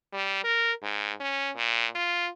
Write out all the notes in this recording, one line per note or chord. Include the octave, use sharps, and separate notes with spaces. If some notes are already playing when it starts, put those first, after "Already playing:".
G3
A#4
G#2
C#4
A#2
F4